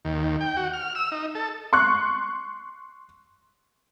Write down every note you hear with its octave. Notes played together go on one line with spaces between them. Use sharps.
D#2
G5
F#4
F6
E6
D#4
A4
C6 C#6 F#6